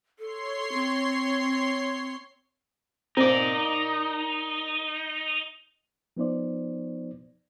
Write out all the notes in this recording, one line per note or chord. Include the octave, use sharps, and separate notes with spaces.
A4 C#5 C6 C7
C4
C4 D#4 A#4 D5
F3 B3 D#4 C5 D5